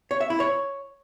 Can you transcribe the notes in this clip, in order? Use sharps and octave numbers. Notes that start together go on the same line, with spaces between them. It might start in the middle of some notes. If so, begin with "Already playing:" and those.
C#5
E5
E4
C#5